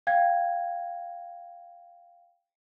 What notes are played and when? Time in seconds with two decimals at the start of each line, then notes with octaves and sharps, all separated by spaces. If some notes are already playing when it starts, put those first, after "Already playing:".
0.07 F5 G5 G#6